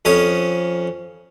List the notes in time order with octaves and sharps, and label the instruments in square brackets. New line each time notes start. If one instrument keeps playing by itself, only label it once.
[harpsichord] F2 C#4 D#6